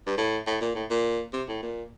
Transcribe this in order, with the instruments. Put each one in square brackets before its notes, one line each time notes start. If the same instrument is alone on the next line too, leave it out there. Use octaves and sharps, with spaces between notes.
[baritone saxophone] G2
A2
A2
A#2
A2
A#2
C3
A2
A#2